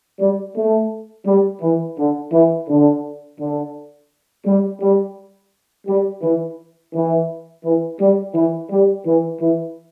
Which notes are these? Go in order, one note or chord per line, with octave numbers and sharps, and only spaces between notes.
G3
A3
G3
E3
D3
E3
D3
D3
G3
G3
G3
E3
E3
E3
G3
E3
G3
E3
E3